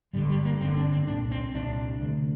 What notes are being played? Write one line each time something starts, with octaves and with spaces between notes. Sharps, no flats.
G1 G2 D3 G3
G3
A#3
G1 G2 D3 C4
D4
C4
C2 A#2 D4
C4
C2 A#2 D4
D2 C3